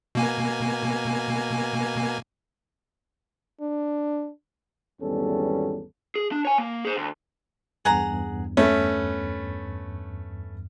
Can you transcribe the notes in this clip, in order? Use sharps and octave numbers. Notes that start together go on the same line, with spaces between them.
B2 A#3 G#5
D4
G#1 E2 G3 B3 C#4 A4
G#4
D4
C#5 G#5
A#3
G#4 C5
D2
E2 G2 G#4 F#5 A#5
A3 C#4 B4